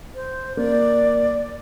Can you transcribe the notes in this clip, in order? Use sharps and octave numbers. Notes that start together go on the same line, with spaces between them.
C5
A#3 D5